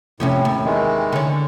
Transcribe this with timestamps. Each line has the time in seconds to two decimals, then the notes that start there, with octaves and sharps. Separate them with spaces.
0.20 F2 A2 C3 C#4
0.45 D#2
0.65 D#3 E3 G#3
1.13 D3 C#4